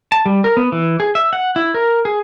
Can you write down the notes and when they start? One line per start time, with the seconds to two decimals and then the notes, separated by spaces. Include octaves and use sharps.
0.12 A5
0.26 G3
0.44 A#4
0.57 B3
0.72 E3
1.00 G#4
1.15 E5
1.33 F#5
1.56 E4
1.74 A#4
2.05 G#4